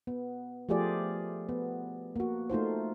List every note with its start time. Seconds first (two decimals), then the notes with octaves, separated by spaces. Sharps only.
0.07 B3
0.69 F3 A3 F4 G4 G#4 D5
1.49 B3
2.16 A#3 F#4
2.50 A3 D#4 F4 C5